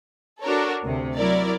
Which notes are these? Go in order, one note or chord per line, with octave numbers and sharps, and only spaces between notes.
D4 F#4 A4 A#4 C#5
D2 C3
F#3 E4 A#4 D5